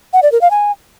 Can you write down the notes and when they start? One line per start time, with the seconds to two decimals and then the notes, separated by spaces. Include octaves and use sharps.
0.13 F#5
0.23 D5
0.32 A#4
0.41 F5
0.51 G#5